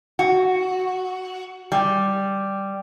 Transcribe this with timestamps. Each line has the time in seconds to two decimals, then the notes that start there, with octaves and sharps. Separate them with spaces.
0.19 F#4
1.72 G3